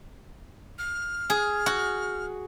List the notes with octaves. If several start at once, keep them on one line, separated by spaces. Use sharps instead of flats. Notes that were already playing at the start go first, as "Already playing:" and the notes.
F6
G#4
F#4